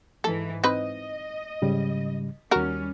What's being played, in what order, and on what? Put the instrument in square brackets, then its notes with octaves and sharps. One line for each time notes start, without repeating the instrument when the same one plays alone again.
[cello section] G#2 E3 [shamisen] A4
[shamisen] C4 D#4 B4 [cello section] D#5
[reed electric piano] G#2 C#3 G3
[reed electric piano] D#2 F6 [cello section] G3 C#4 [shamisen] F#4 A#4